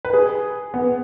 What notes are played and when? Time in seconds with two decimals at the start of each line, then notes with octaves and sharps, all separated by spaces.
0.05 B4
0.14 G#4
0.74 B3